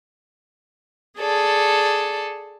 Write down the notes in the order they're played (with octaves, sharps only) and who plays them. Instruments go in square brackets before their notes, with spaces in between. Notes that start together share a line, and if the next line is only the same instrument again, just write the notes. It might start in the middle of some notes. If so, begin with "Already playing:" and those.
[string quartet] G#4 A4 D5